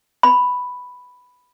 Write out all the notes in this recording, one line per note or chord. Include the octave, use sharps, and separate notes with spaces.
B5